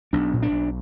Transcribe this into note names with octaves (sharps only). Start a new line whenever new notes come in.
B1 D4
A#2
D4
B1